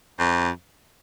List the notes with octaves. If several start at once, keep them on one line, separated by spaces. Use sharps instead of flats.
F2